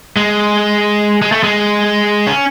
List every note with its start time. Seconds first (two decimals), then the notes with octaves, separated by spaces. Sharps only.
0.17 G#3
1.22 G#3
1.32 A3
1.43 G#3
2.27 C#4